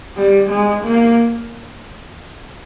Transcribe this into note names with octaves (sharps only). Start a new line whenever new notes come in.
G3
G#3
A#3